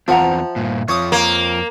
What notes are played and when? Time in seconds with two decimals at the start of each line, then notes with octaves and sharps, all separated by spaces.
0.08 E2 F3 C4 E5 F#5 A#5
0.56 G2 A#2
0.88 F2 F3 C#5 D6 D#6
1.12 A#3